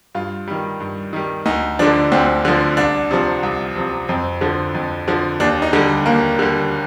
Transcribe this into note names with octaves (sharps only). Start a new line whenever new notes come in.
G2 F4
D#3 G3
G2
D#3 G3
D2 D#4
D3 F3 D4
D2 C4
D3 F3
C2 D4
C3 F3
C2
C3 F3
F2 C4
D3 F3
F2
D3 F3
D#2 D4
D#4
D3 G3
D#2 A#3
D3 G3